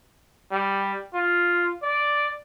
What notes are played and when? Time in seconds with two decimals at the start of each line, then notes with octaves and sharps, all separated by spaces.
0.52 G3
1.14 F4
1.83 D5